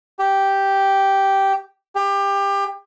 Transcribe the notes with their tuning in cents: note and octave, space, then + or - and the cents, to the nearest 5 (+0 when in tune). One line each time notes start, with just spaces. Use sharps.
G4 -5
G4 +25